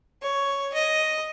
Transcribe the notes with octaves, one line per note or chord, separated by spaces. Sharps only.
C#5
D#5